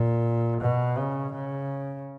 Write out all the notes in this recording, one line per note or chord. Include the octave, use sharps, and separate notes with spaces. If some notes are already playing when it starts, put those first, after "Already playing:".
Already playing: A#2
B2
C#3
C#3